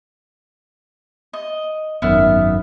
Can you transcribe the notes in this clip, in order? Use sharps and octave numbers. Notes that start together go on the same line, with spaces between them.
D#5
G#1 F#2 D#3 B3 E5 F6